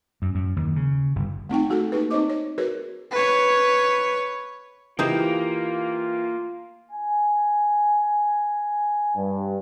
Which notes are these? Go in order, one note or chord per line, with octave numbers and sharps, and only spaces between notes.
F#2
F#2
D#2
C#3
G1
A3 C4 D#4 G5
A3 F#4 G#4 A4
A#3 D#4 G4 G#4 B4
C4 D#4 C5 C#5 D#5 D6
C#5
F#4 G#4 A#4 B4 C#5
B4 C#5
E3 A#3 D#4 F4 G4 G#4 C5
G#5
G2